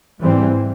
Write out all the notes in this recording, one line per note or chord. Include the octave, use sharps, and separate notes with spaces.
G#2 E3 G3 C4